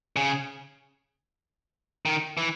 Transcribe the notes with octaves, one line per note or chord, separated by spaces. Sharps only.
C#3
D#3
E3